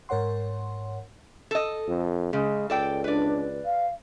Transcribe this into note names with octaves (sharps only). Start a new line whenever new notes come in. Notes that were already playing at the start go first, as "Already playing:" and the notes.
G#2 A#4 C#5 F#5 C6
A4 D#5
F2
C#3 G#3
C#2 A4 D5 G5
D4 B4 D5
F5